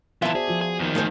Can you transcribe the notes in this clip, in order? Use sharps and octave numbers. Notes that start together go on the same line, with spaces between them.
E3 B3 F4 E5 A5
F#4 G#4 C5 D5
F3 F4 F#4
G#4
E2 D#3
A3 G#4 C5